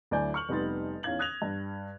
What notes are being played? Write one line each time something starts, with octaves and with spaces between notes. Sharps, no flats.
D2 F#3 E4 D5 G#5 G6
C#6 F6 F#7
F1 G3 B3 D#4 C6 A6
E2 C#4 D#4 F5 G#6 F#7
D#6 F#6 G#6 A#6 F7
G2